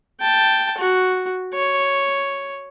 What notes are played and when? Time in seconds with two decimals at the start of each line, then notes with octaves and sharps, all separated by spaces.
0.20 G5 A5
0.78 F#4
1.54 C#5